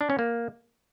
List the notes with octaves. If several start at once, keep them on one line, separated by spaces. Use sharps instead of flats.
D4
C#4
A#3